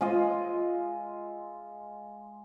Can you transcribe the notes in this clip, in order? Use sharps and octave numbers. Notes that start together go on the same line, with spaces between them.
G#3 F4 D#5 E5